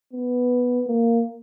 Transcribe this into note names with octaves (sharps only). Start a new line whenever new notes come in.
B3
A#3